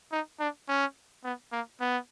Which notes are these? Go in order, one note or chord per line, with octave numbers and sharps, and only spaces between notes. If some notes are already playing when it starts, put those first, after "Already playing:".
D#4
D4
C#4
B3
A#3
B3